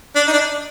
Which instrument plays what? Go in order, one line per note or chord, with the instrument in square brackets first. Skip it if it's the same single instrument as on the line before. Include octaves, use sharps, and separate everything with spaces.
[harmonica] D4
D#4
D4